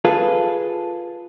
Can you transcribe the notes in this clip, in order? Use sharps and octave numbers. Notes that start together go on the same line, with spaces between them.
F4 G#4 A4 B4 F5